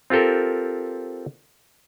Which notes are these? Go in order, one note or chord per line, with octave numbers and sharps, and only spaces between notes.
C4 F4 G4 A4 A#4